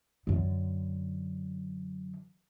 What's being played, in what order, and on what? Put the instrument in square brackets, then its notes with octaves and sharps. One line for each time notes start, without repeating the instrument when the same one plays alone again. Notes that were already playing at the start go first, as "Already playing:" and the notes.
[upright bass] F#2 D3